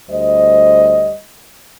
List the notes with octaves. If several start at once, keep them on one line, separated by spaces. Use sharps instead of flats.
D2 G3 C5 D#5